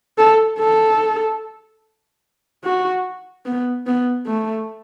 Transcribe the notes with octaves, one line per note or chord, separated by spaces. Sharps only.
A4
A4
F#4
B3
B3
A3